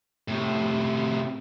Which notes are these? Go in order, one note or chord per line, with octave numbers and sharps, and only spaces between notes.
A2 C3